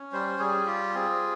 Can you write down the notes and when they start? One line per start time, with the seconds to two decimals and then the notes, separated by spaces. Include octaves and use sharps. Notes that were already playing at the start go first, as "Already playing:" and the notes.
Already playing: C#4
0.13 G3 C5
0.39 G3 G#4
0.66 F4 G4
0.94 C4 G#4